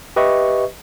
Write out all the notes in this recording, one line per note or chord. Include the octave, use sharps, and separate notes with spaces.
G4 B4 D#5 E5 C#6